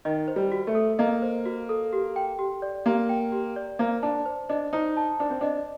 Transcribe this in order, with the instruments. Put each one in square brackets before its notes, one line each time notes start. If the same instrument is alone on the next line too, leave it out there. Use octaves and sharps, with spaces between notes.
[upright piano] D#3 [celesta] D#5
[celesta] C5
[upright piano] G3
[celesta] F#4
[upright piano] A3
[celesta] A4
[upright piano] A#3 [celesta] D#5
[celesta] C5
F#4
A4
G4
G5
G4
D5
[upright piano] A#3 [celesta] G4
[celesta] G5
G4
D5
[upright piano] A#3 [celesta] C5
[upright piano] D4 [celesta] A5
[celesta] C5
[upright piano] D4 [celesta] D#5
[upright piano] D#4 [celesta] C5
[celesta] A5
[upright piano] D4 [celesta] C5
[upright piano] C4
[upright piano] D4 [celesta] D#5